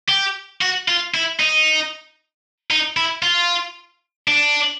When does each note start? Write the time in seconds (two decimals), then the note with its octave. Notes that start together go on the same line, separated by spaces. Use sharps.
0.09 G4
0.61 F#4
0.88 F4
1.14 E4
1.40 D#4
2.71 D#4
2.97 E4
3.23 F4
4.28 D4